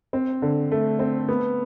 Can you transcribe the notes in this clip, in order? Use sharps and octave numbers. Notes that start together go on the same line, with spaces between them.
C4
D3
A3
C4
B3